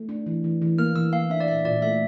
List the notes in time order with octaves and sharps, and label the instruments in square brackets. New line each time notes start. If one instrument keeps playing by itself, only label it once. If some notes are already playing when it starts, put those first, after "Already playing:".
Already playing: [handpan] A3
D4
E3
E3
E3
[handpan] A#3 [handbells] F6
[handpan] E3 [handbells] E6
[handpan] A#3 [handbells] F5
[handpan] D4 [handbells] E5
[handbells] D5
[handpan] A#2 [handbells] E5
[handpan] A#2 [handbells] D5
[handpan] A3 [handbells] E5